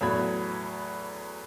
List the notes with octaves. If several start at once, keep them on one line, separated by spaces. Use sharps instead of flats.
E2 A2 F#3 B5 G#6